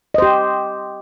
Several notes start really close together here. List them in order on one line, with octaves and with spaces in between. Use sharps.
D#5 C5 G4